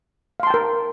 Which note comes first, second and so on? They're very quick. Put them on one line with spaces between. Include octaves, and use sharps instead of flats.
F5 C6 A5 G5 A#4